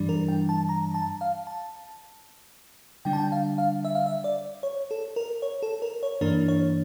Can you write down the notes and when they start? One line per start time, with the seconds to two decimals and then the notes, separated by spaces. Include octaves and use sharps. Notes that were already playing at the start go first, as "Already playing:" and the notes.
Already playing: G2 E3 G3 D4
0.09 A#4
0.28 G5
0.49 A5
0.69 A#5
0.94 A5
1.21 F5
1.47 A5
3.05 D3 G3 D4 G5
3.13 A5
3.20 G5
3.32 F5
3.58 F5
3.85 E5
3.95 F5
4.06 E5
4.24 D5
4.63 C#5
4.91 A4
5.16 A#4
5.42 C#5
5.63 A4
5.82 A#4
6.03 C#5
6.21 G2 E3 A#3 D4 A#4
6.48 C#5